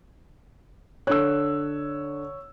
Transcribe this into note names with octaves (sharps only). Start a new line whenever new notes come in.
D3 C#5 E6 F#6